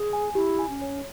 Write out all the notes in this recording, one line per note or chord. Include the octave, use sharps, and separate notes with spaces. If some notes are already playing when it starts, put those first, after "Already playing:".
Already playing: G#4
G#5
E4 G4
G#5
C#4
C#5